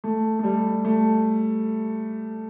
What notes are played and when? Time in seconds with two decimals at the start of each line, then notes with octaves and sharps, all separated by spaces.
0.04 A3
0.39 A3
0.44 G3
0.85 A3